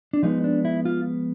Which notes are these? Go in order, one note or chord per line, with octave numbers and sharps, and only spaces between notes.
D4
F3 G#3 B3 D#4
D4
E4
F4